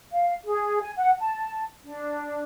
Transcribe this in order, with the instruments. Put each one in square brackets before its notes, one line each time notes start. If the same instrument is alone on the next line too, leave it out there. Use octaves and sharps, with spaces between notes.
[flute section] F5
G#4
G#5
F#5
A5
D4